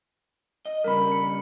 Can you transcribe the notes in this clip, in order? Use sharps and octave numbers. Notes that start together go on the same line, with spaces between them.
D#5
G2 C#3 G3 A#4 B5
C#7